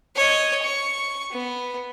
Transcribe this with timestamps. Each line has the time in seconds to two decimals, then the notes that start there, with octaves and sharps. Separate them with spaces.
0.16 C#5 D#5
0.62 C#6
1.31 B3